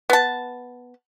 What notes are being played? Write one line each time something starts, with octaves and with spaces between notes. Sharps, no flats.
B3 A5